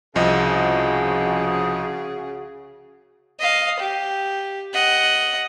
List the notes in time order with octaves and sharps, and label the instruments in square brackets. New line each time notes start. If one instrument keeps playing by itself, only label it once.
[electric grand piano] C2 F3 D#5 [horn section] C#3 F#4 G#4
[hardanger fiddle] D#5 F5
G4
D#5 F#5